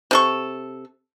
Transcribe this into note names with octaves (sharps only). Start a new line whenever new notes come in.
C3 A4 C#6